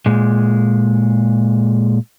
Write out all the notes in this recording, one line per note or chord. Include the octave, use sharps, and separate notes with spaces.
A#2 G#3